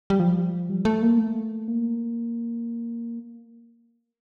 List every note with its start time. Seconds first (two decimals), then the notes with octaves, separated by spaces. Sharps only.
0.10 G3
0.20 F3
0.70 G3
0.85 A3
1.02 A#3
1.19 A3
1.68 A#3